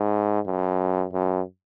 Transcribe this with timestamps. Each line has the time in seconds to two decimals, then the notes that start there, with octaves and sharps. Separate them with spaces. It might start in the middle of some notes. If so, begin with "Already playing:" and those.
Already playing: G#2
0.46 F#2
1.13 F#2